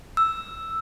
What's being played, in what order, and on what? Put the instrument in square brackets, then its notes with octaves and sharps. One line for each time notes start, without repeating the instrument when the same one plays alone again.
[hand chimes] E6